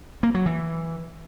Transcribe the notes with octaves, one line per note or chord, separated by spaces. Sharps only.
A#3
F#3
E3